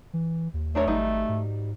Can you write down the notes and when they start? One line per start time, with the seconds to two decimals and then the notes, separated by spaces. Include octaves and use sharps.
0.14 E3
0.54 D#2
0.75 A3 D4 A#4 C#5
0.87 G#1 F#3 G3 D#4
1.29 G#2